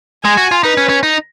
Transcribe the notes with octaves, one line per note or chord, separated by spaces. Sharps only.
G#3 G#5
F#4
F4
D#4 B4
C#4
C#4
D#4